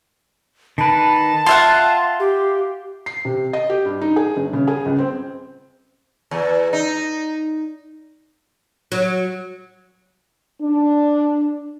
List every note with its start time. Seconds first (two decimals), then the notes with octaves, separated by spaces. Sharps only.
0.78 D#3 B4 A5
1.46 F4 E5 F#5 C6
2.20 G4
3.06 C7
3.25 C3
3.53 D#5
3.70 G4
3.85 G2
4.01 D#4
4.16 G#4
4.37 G1
4.53 C#3
4.67 G#4
4.86 C#2
4.98 C4
6.31 E2
6.73 D#4
8.92 F#3
10.61 D4